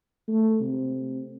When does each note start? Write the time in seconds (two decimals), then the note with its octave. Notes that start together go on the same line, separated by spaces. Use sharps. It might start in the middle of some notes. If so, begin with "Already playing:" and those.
0.28 A3
0.62 C3